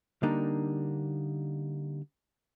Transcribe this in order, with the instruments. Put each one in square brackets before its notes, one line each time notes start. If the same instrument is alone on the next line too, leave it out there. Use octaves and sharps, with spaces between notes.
[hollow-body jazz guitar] D3 G3 A#3 D4 D#4